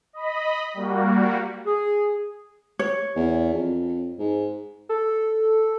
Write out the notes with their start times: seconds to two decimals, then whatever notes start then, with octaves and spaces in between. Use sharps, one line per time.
0.13 D#5 B5
0.74 G3 A#3 F#4
1.66 G#4
2.79 C#5
3.16 E2
3.53 F2
4.19 G#2
4.89 A4